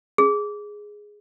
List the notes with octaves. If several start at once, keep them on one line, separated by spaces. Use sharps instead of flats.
G#4